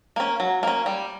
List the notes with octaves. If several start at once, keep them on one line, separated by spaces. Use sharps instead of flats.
A#3 C#4
F#3
A#3 C#4
G3